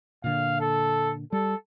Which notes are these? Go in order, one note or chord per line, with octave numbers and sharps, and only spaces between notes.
A#2 D3 F5
A4
G3 A4